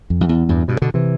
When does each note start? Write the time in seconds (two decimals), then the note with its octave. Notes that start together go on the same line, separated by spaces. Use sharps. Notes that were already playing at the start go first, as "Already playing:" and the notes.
0.10 F2
0.21 F2
0.29 E2
0.49 E2 G2
0.68 G2 B2
0.82 B2 D3
0.94 C3 E3